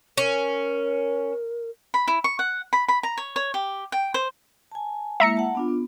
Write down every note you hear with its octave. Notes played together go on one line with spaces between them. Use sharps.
C#4 A#4
B5
E4
C#6
F#5
B5
B5
A#5
C#5
C#5
G4
G5
C5
G#5 A5
G#3 A#3 E4 E5 A#5 C#7
F#5 A5
B3 D4 F4
B3